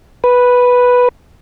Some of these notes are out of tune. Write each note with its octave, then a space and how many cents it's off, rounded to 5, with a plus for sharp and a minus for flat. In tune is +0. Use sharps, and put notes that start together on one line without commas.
B4 -5